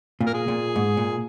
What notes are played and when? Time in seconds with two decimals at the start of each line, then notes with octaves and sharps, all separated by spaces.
0.21 A#2
0.27 A#4
0.34 G#4
0.48 A#2
0.76 G#2
0.97 A#2